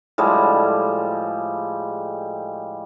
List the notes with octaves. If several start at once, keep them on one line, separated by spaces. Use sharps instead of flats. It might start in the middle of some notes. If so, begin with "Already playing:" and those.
A2 F3 G3 G#3